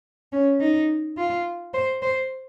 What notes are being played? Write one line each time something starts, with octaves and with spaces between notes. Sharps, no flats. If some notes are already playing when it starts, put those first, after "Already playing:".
C#4
D#4
F4
C5
C5